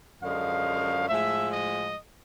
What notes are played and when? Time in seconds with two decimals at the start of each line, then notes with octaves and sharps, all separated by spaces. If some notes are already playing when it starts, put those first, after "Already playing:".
0.22 F#2 D3 F3 G#3 F5
1.08 A2 F3 G#3 E5
1.51 D#5